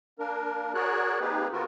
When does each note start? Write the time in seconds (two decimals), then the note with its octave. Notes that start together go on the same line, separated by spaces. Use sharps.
0.19 A#3 D4 A#4
0.74 F#4 G#4 A#4 C#5 D5 F#6
1.20 A#3 C4 D#4 G4 G#4 B4
1.52 D3 B3 C4 F4 F#4 A#4